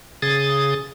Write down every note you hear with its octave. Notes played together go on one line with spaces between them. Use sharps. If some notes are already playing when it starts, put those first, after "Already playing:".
C#3 G#4 D#6 A6